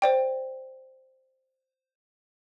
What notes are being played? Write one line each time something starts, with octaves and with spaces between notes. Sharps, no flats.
C5 D5 G5